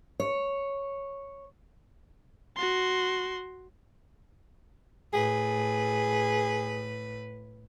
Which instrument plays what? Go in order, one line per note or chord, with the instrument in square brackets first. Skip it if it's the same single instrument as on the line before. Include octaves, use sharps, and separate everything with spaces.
[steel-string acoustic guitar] C#5
[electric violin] F#4 C6
[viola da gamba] A2 B4 [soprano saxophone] G#4